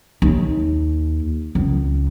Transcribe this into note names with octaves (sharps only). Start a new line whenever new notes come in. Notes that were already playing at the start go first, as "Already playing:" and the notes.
D#2
C#2